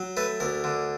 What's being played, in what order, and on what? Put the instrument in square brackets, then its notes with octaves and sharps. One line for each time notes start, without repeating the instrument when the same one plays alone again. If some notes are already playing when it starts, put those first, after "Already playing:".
Already playing: [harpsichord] F#3
A3 B4
D2 A#4
D3